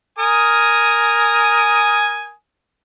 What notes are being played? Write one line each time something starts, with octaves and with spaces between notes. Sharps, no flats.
A#4 G#5 D#6